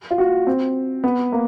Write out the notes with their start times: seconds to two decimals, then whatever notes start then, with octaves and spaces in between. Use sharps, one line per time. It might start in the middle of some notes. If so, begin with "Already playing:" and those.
0.11 F4
0.18 F#4
0.47 C4
1.04 B3
1.32 A#3